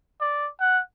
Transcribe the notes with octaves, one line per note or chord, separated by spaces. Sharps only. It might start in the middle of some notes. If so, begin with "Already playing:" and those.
D5
F#5